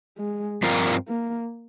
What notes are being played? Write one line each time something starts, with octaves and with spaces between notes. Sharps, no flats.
G#3
G2 F3 C4 F4 A#4
A#3